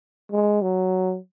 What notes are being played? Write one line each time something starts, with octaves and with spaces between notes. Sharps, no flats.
G#3
F#3